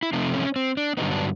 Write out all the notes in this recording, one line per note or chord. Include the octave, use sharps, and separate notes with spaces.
E4
C3 F3 A3 C4 D#4
C#4
C4
D4
G2 D3 F#3 B3 D#4
D4